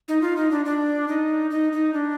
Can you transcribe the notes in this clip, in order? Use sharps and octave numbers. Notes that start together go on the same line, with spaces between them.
D#4
F4
D#4
D4
D4
D#4
D#4
D#4
D4